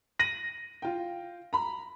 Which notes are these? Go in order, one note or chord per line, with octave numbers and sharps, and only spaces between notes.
A#6 D#7 F#7
F4 G5
A#5 B5